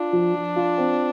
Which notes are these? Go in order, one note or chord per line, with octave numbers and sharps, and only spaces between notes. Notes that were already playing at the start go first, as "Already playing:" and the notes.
Already playing: D4 F4
F3
F3
F4
C4